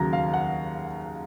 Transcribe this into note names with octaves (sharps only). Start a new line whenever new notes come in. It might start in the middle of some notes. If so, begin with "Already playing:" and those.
Already playing: D#2 C#3 F#3 A#5
F5
F#5